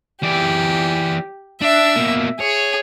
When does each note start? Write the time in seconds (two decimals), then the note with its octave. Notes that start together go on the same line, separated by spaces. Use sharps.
0.23 E3 G4 D5
1.61 D4 E5
1.96 B2 A#3
2.40 G#4 C#5